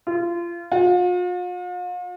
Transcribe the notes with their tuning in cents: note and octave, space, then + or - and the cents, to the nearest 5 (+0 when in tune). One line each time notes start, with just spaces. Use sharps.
F4 -25
F4 +45